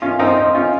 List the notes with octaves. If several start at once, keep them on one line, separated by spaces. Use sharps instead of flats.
C#4 F4
C4 D#4
C4 D#4
C#4 F4